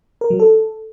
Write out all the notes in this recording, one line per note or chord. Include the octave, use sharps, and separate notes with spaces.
A#4
F#3
A4